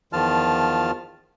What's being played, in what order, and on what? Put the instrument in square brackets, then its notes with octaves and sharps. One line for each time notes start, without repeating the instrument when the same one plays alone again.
[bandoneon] E2 D#3 F3 F4 A5 F6